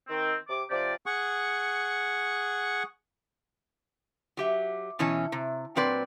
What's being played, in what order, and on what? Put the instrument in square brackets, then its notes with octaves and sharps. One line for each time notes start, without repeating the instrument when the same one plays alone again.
[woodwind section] D#3 C4
C3 D6
C3 F3 G4 D5
[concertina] G#4 F#5 C#6
[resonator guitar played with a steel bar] F#3 G4 E5
B2 E3 C#4 A5
C3
A#2 F#3 C4 B4 D5